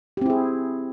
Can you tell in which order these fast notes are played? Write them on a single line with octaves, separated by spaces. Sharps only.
G4 C4 E4 G#4